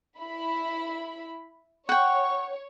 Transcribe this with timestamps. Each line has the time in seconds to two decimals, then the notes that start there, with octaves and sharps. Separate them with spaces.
0.19 E4 B5
1.89 C#5 F#5 G5 C#6